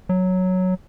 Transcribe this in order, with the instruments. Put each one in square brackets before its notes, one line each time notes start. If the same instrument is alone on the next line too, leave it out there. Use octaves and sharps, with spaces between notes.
[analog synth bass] F#3